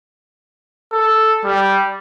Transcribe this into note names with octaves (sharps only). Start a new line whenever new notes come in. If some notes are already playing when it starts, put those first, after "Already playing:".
A4
G3